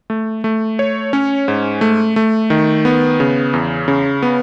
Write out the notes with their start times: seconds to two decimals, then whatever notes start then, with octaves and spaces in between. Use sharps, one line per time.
0.10 A3
0.44 A3
0.79 C#5
1.13 C#4
1.48 G#2
1.81 A3
2.16 A3
2.50 D#3
2.85 B3
3.20 C#3
3.53 E2
3.88 C#3
4.23 B3